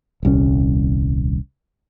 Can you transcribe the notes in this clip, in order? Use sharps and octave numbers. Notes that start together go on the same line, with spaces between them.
D#1 C2 C#4